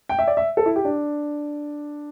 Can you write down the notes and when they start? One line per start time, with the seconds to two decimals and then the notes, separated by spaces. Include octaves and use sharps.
0.09 G5
0.19 E5
0.27 D5
0.37 E5
0.57 A4
0.66 E4
0.76 G4
0.85 D4